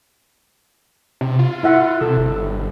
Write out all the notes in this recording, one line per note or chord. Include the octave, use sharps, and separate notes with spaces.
C3
F4
E4 E5 F#5
C3 A4 E6
G1